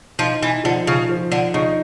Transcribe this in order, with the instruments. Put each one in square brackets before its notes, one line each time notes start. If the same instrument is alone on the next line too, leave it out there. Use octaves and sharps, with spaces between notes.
[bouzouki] F3 [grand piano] D#4
[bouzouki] E3
[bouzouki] D3 [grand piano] F3
[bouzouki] C#3
[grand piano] F3
[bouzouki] D3
[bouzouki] C#3 [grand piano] D#4